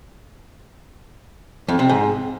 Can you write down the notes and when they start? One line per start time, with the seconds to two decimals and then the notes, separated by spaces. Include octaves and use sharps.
1.68 F2
1.79 C3
1.89 G#2